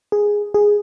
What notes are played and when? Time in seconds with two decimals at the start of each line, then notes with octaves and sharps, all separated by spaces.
0.12 G#4
0.54 G#4